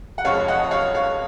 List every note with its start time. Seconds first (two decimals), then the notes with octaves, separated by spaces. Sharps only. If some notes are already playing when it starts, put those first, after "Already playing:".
0.18 F#5
0.25 F1 F2 F3 G#3 C#5 F5
0.48 D#5 F#5
0.71 C#5 F5
0.95 C#5 F5